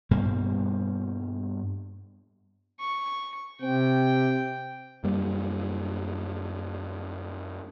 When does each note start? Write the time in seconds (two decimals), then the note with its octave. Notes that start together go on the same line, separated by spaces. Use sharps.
0.11 G2 B2 G3 A#3
2.80 C#6
3.62 C3 C4 G5
5.04 F#2 G3 A#3